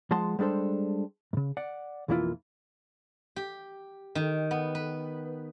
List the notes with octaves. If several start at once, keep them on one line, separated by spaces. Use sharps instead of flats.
F3 G#3 F#5 A5 C6
G3 G#3 D4 A4 C5
F#2 C#3
D5 F#5
B1 F2 E3 A#3 E4 F4
G4
D#3
B3
B4